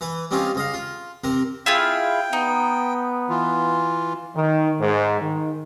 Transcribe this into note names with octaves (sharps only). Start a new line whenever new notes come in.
E3 B4
G3 C4 C#4 D#4 F4
C#2 D#5 F5
F4
C3 C4 A#4
E4 F4 G#4 G5
B3 D#4
E3 F4
D#3
G#2
D#3